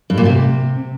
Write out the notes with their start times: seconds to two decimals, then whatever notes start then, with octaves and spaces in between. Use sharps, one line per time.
0.10 G2
0.18 A#2
0.25 C3